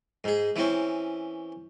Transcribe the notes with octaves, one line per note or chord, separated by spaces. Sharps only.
G#2 G#4
E3 C4 C#4